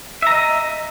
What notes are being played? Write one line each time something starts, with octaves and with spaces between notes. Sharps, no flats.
D#5 E5 A#5